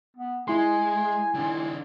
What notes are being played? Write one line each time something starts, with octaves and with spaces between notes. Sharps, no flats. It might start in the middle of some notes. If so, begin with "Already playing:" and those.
B3
G#3 E4 G#5 C6
D#3 D4